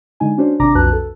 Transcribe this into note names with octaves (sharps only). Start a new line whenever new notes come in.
D3 G#3 D#4 G#5
C#4 D4 F#4 C5
G#1 C3 D4 A#5 D6 A#6
B1 F2 F#4 B4 A5 F#6
A4